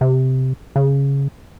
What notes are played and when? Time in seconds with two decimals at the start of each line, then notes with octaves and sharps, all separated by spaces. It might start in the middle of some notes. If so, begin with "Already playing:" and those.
0.01 C3
0.76 C#3